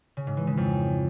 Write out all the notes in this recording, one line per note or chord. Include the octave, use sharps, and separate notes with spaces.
C#3
G#2
E3
C#3
F2